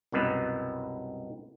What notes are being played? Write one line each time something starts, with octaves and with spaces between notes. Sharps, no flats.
C2 F#2 B2 B4